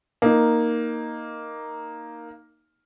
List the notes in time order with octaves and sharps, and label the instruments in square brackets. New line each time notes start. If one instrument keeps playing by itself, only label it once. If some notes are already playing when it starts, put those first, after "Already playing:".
[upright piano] A#3 D#4